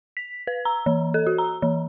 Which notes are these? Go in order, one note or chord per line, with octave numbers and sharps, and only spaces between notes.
B6
B4
A#5
E3
A4
F#4
A#5
E3